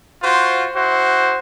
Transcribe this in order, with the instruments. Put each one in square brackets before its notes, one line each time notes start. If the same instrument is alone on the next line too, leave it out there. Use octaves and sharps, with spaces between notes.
[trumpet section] F4 F#4 C5
E4 F#4 C5